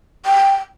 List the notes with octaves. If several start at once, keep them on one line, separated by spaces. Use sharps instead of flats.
G5